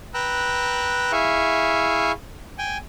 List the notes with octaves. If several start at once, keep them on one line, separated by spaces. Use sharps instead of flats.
B4 G5 A#5 E6 F#6
E4 G#4 E5 F5 C#6
G5 G#5